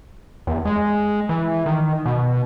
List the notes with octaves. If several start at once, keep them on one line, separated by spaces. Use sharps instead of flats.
E2
G#3
E3
D#3
B2